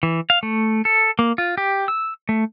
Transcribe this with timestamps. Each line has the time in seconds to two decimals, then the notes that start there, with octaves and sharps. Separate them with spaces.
0.03 E3
0.30 F5
0.43 A3
0.85 A4
1.19 A#3
1.38 F4
1.58 G4
1.88 E6
2.29 A3